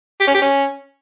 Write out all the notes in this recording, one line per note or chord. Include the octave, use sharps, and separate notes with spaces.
G4
C#4
G4
C#4